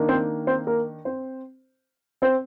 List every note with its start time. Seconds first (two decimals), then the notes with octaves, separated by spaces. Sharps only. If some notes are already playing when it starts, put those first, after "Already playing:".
Already playing: D#3 A#3 D4
0.09 C4 C5
0.47 C4 C5
0.67 A#3 A#4
1.05 C4 C5
2.22 C4 C5